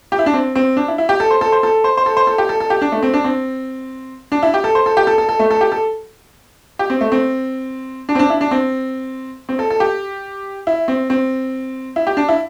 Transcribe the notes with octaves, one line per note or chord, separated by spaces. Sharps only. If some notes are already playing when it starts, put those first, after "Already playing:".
G4
E4
D4
C4
C4
D4
E4
E4
G4
A4
C5
A4
C5
A4
C5
C5
A4
C5
A4
G4
A4
A4
G4
D4
A3
C4
D4
C4
D4
E4
G4
A4
C5
A4
G4
A4
A4
A4
A3
A4
G4
A4
G4
C4
A3
C4
D4
C4
D4
E4
D4
C4
C4
A4
A4
G4
E4
C4
C4
E4
G4
D4
E4